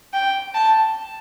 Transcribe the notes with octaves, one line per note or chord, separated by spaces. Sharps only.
G5
A5